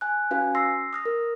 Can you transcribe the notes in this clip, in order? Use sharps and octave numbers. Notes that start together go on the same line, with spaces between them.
G#5 F#6
C#4 F#4 B4 F5 G#5
C6 E6 A#6 C7
D#6 F6 A#6
A#4